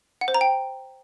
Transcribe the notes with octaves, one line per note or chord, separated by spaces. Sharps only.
F#5
C5
A#5
G5